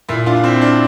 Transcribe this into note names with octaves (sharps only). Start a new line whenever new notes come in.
A#2 E4
D4 F4
C4 E4
D4